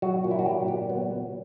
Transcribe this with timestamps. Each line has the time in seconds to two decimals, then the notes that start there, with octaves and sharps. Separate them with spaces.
0.02 F#3 F#4
0.24 A#2
0.31 E4
0.39 F#4
0.46 F#3 G4
0.68 A#2 G4
0.89 F#3 B3